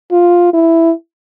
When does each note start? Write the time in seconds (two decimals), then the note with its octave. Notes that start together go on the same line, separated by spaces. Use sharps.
0.11 F4
0.53 E4